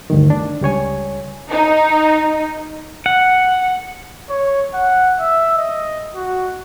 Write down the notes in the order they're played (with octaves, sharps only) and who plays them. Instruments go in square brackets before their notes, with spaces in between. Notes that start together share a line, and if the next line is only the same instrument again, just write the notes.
[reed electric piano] D2 G2 D#3
D4
C#2 G3 C#5 G#5
[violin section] D#4
[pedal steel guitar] F#5
[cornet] C#5
F#5
E5
D#5
F#4